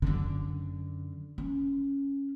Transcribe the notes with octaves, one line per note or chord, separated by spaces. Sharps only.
F#2 D3
C#4